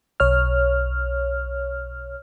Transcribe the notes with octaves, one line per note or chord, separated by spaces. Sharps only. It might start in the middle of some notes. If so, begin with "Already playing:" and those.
B1 C#5 F6